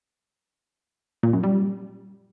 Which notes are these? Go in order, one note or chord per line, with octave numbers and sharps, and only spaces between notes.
A#2
F#2
G3